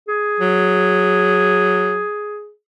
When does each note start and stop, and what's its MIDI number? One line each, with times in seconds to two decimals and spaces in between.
0.08 2.50 68
0.40 2.04 54